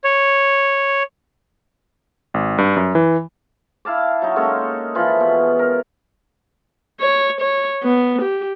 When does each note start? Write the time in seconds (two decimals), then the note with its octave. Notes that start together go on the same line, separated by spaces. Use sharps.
0.04 C#5
2.34 G#1
2.58 G2
2.76 F#2
2.95 E3
3.85 E4 F5 A5 D6
4.22 F#3 D#4
4.36 G#3 A#3 C#4 A4
4.95 E3 F3 F4 B5
5.20 B2
5.59 A#4
7.01 C#5
7.41 C#5
7.83 B3
8.22 G4